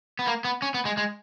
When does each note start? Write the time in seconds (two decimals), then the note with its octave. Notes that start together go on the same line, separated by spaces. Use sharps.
0.19 B3
0.27 A#3
0.44 B3
0.62 C#4
0.74 B3
0.85 G#3
0.97 G#3